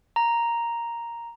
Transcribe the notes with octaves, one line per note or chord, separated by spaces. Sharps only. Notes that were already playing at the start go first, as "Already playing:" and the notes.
A#5